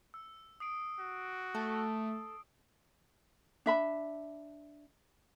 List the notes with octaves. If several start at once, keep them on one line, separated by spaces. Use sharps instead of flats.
E6
D#6 C7 D7
F#4
A3 A4
D4 E5 B5